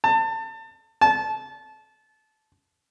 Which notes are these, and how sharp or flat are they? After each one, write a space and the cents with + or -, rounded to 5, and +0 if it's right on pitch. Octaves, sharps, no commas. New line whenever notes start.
A5 +30
A5 -20